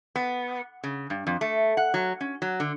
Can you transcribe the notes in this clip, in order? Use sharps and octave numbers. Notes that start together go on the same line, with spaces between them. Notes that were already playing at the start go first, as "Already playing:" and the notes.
B3
C#3
G2
F2
A3
F#5
F#3
C#4
F#3
D3